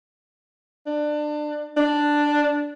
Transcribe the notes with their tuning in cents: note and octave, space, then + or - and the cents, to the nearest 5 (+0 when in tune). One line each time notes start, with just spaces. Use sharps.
D4 +25
D4 +5